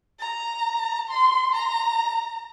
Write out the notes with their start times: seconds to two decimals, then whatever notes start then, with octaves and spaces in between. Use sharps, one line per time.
0.19 A#5
1.09 C6
1.54 A#5